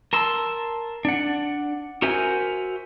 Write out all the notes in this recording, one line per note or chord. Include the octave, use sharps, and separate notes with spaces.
A#4 A5 C6 E6
D4 F#5
F#4 A#4 C5 E5 G#5